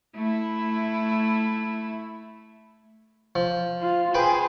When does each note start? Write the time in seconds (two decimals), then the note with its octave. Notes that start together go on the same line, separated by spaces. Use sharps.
0.15 A3 E4
3.36 F3
3.81 F4
4.14 G#4 B4 C5 G5 B5